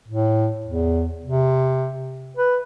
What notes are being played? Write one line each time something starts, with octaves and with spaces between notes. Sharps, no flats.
A2
E2
C3
B4